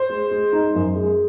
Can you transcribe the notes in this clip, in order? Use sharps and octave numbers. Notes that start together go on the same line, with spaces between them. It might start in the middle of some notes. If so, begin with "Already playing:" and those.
Already playing: C5
G#3
G#3
D#4
F#2
G#3